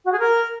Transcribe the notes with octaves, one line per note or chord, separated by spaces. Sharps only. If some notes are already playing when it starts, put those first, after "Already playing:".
F#4
G#4
A#4